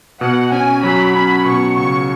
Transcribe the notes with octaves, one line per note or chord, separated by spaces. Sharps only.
B2 F#5
C#4 G#5
F#3 B5
C#4 B5
B2 C#6
C#2 C#6